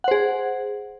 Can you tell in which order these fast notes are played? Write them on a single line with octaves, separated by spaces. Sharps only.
F#5 C5 G#4